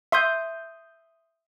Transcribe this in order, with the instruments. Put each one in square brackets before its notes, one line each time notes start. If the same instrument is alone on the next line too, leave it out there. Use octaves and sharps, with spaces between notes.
[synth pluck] E5 C6 D#6 G6